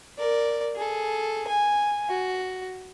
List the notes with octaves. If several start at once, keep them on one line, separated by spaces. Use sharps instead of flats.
A#4 D5
G#4 A4
G#5
F#4